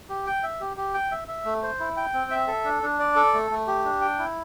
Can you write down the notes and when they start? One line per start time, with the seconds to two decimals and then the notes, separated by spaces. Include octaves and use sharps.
0.09 G4
0.26 G5
0.43 E5
0.61 G4
0.77 G4
0.94 G5
1.11 E5
1.28 E5
1.45 A3
1.63 C5
1.80 E4
1.97 G5
2.13 C4
2.31 E5
2.47 A4
2.65 D4
2.83 D4
2.99 D5
3.16 A4
3.33 A3
3.51 A3
3.67 G4
3.85 D4
4.01 G5
4.19 E4